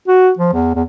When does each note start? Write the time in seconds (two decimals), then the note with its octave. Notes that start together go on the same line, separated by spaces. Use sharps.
0.08 F#4
0.39 F3
0.53 E2
0.75 E2